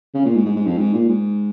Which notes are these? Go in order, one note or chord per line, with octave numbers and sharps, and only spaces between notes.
C#3
A#2
G#2
G#2
G#2
F2
G#2
A#2
G#2